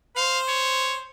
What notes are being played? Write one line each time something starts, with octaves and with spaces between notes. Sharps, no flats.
C5 F5
C#5